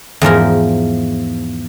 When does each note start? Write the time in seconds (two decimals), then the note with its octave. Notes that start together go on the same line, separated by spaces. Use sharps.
0.22 E2 G#2 F3 A#4